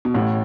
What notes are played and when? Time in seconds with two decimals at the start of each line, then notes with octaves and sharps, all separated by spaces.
0.05 B2
0.14 A1 A2